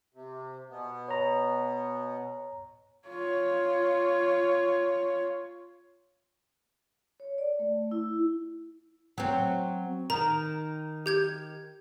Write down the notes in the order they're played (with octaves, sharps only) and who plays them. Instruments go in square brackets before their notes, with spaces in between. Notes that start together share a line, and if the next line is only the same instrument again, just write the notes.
[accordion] C3
B2 B3
[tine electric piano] C#5 A#5
[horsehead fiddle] F4 C#5
[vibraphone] C#5
D5
A3
E4
[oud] F#3 C4
[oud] D#3 [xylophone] A#5
[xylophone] G4 G6 G#6